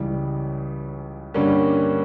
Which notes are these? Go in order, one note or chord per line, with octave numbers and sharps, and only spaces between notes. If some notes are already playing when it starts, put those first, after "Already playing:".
Already playing: C#2 C#3 E3 G3
G2 D3 G3 A#3 C#4